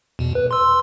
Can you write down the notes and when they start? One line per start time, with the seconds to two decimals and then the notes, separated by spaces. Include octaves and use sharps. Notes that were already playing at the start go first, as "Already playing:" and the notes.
0.19 E2 B2
0.35 B4
0.51 C6 E6